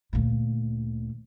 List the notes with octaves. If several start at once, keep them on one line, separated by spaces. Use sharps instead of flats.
D2 A#2